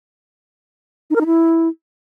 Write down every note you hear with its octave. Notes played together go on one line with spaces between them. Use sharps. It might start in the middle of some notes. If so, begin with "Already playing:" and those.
D#4
A#4
D#4
E4